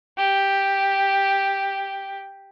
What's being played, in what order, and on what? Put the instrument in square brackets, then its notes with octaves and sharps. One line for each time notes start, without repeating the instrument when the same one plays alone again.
[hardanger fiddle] G4